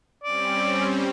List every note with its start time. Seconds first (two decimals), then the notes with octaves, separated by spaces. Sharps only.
0.24 G3 C4 C#4 D5